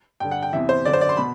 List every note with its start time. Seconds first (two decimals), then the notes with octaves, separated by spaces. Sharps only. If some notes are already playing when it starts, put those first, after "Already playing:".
0.20 G2 D3 G5
0.31 F#5
0.43 G5
0.53 E2 C3 E3 E5
0.69 C5
0.85 F#2 D3 D5
0.93 C5
1.01 D5
1.09 C6
1.17 B2 B5